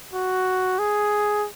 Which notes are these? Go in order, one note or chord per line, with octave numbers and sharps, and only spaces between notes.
F#4
G#4